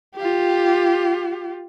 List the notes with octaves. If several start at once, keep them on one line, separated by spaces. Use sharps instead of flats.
F4 G4